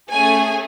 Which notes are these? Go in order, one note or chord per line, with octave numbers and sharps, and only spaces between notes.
A3 C#4 G#4 G#5